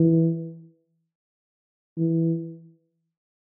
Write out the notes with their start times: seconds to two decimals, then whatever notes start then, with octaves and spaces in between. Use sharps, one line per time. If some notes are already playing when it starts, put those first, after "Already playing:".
Already playing: E3
1.98 E3